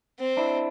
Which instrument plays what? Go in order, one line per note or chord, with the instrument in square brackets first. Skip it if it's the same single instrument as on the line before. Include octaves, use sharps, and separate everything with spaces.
[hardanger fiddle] C4
[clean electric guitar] D4 E4